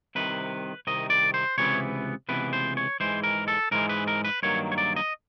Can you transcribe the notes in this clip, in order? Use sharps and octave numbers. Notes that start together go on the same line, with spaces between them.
C2 C3 D#3 B4
C2 C3 D#3 D#5
D5
C5
C#2 C3 E3 B3 C#5
C#2 C3 E3 B3 B4
C5
C#5
G#2 E3 G#3 C5
A#4
A4
G#2 E3 G#3 A#4
B4
A#4
B4
G2 D#3 F#3 A#3 C#5
C#5
D5
D#5